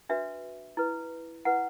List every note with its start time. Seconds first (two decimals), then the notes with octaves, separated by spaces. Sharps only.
0.09 D4 F#4 B4 E5
0.77 E4 B4
1.45 E4 B4 F#5